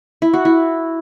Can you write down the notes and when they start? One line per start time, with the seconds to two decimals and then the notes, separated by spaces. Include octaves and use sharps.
0.22 E4
0.34 F#4
0.45 E4